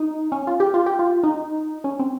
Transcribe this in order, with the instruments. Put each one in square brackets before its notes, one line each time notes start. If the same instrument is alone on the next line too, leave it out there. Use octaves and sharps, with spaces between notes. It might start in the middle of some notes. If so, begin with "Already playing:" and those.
Already playing: [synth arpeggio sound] D#4
C#4
F4
G4
F4
G4
F4
D#4
C#4
C4